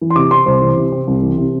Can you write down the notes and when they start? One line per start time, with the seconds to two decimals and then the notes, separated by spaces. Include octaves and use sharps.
0.01 E3
0.10 C6
0.16 C3 D6
0.31 C4 C6
0.46 C2 C5
0.61 E3
0.77 C3
0.92 C4
1.07 C2
1.22 E3
1.38 C3